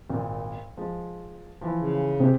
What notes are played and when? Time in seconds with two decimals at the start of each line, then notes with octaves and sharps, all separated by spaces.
0.10 G#1 A#2
0.77 F3 G#3
1.61 E3 F3
1.78 C#3
2.20 C3 G#3 G4